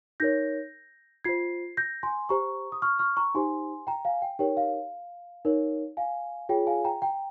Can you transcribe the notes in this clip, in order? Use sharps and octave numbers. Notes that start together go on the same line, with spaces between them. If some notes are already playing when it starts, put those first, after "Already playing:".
D#4 A#4 C#5 G6 A#6
F4 C5 G#6 C7
G6 A#6
G#5 C6
G4 C5 A#5 C#6
D#6
C#6 F6
C#6 F6
A#5 C#6
D#4 G4 C5 G#5 C6
G5 A#5
F5 G#5
G5
D#4 G4 A#4 C#5 G5
F5
F5
D#4 A#4 C#5
F5 G#5
F4 G#4 C#5 G5
F5 G#5
G5 A#5
G5 A#5